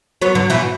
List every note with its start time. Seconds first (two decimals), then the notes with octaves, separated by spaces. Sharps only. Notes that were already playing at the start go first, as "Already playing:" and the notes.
0.22 F#3 B3
0.35 D3 F#3
0.50 B2 E3